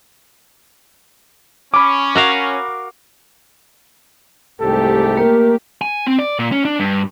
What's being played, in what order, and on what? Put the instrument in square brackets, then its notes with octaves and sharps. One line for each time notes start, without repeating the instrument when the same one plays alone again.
[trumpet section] C#4 [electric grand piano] B5 D6
[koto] F#4 A#4 F5
[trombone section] C2 G#2 A4 [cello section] A3 G4
[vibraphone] A#3 [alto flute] A#4
[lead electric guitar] G#5
C4
D5
A#2
C#4
D4
G2